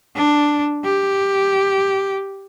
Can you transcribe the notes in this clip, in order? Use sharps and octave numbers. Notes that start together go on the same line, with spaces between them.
D4
G4